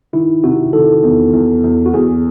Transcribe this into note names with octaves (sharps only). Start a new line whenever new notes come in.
D#3 E4
C3 F#4
D#3 A4
E2
E2
E2
F#4
E2 G#4